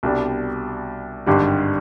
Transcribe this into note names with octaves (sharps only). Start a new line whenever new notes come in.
C2 B2 G3 D4
G#1 G2 D3 G3